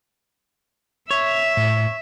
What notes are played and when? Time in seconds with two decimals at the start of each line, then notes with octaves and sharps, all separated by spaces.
1.11 C#5 E5
1.57 A2